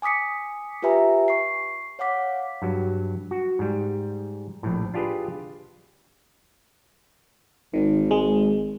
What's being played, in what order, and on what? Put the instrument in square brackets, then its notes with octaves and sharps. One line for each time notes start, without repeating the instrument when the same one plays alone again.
[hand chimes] G#5 D6 D#6 B6 C#7
F4 G4 B4 E5 G#5 A#5
C#6 C7
C#5 F5 F#5 D6 B6
[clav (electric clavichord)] G2 F#3
F#4
G#2 G3
A#1 A2
D4 F4 G4 G#4 B4
[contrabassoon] G#1 [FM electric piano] D#3
[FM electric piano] G#3